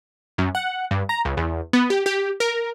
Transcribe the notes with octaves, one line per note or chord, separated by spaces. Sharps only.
F#2
F#5
G2
A#5
C#2
E2
B3
G4
G4
A#4